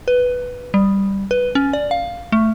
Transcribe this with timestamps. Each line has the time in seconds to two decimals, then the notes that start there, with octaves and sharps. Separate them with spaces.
0.08 B4
0.74 G3
1.31 B4
1.55 C#4
1.73 D5
1.91 F5
2.32 A3